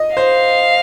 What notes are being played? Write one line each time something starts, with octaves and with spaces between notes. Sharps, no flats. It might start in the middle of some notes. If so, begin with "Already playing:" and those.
Already playing: D#5
C5 F5